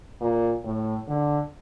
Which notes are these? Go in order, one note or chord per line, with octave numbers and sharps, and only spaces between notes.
A#2
A2
D3